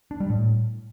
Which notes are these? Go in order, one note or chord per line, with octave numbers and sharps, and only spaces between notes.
D4
G3
A2